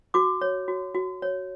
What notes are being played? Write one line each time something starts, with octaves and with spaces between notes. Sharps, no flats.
F#4 D6
C#5
F#4
F#4
C#5